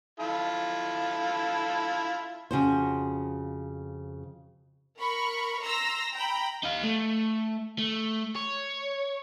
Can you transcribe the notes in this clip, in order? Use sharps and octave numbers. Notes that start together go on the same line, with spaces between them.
E4 F4 A4
F2 C#3 F#4 C5
A#4 B5 C#6
A#5 C6 E6 A#6
G5 A#5 B5
D#4 F5
A3
A3
C#5